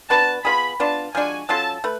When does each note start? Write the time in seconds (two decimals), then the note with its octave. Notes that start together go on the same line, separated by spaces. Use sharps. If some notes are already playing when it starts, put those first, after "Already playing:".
0.10 B3 D4 F#4 B4 A5
0.45 B3 F4 G#4 B5
0.80 B3 D4 F4 A5
1.14 F3 G#3 D4 F#4 G#5
1.49 F#3 C#4 F4 A4 A5
1.84 A3 B4